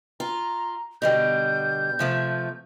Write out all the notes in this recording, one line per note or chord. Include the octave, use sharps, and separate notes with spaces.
F4 A#5
B2 D3 G3 G6
C3 F3 A3